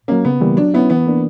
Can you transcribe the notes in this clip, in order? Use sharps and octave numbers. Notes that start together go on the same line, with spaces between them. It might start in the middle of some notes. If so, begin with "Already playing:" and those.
F#3 A#3 C#4
C#3 B3
E3 G3 A#3
F#3 D4
B3 C#4 E4
E3 B3
A#3 D4